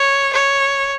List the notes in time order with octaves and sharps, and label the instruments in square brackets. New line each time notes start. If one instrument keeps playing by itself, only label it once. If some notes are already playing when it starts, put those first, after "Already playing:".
Already playing: [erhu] C#5
C#5